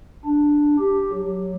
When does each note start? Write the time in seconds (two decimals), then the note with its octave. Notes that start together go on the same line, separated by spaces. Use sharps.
0.25 D4
0.79 G4
1.13 F#3